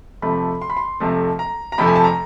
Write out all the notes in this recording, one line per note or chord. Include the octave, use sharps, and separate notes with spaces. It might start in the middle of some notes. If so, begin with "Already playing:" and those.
F2 C3 F3 A3 B5
C6
B5
C6
F2 C3 F3 A3
A#5
A#5
F2 C3 F3 A3 B5
G#5
A5
A#5